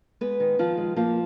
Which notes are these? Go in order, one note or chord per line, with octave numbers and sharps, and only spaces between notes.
G#3 B3 B4
D#3
D#3 F3 F4
G#3
F3 A#3 F4